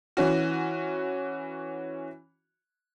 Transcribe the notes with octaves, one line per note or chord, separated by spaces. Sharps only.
E3 C#4 F#4